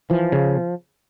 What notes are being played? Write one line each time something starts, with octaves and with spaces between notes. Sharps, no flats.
E3 F3
C#3